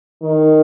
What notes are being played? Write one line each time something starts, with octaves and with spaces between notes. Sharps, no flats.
D#3